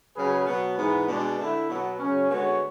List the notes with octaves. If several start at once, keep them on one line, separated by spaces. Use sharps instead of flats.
C#3 F#3 C#4 G#4 B4
B2 F#3 B3
G#2 E3 B3
B2 G#3 D4
D3 A3 E4
B2 F#3 B3
C#3 F#3 C#4
D3 G#3 B3 F#4 C#5